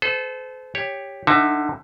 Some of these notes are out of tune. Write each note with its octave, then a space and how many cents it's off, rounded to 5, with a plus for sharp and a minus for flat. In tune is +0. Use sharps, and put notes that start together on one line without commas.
A4 -30 C5 -35
G4 +10 C#5 +0
D3 +20 D#4 +0 E5 +0